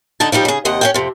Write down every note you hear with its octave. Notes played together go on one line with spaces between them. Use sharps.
D3 D4 D#4 A5
F3 G3 D#4 G4
C#3 G#4
D#2 C3 D#5 F#5
C#4 F4 G5
F2 C3